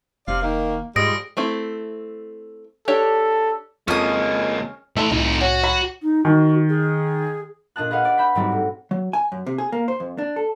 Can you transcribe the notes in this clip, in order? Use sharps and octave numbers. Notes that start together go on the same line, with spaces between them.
F1 C3 D5 F5
D#3 A#3
G#2 F3 G3 G#3 D#6 A#6 D7
A3 C4 E4
D4 G4 A4 C#5
F2 C#3 G#3 A#3 C#4 A5 D#6
A3 E4 A4 E5 C6
C2 F2 A2 D#4 E4
C#4 F#4
F#3 B5
D#4
D#3 F#4
G#4
A#2 D4 D#5 A5 F#6
G#4 B4 D#5 F5 F#5
D5
E5 B5 G6 B6
G#2 F#3 G3 C4 E4 F#4
A2
F#3
G#5
F#2
C3
G#4
A#3
C5
F2
D4
A4